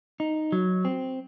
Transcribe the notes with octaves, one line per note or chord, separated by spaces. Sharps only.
D#4
F#3
C4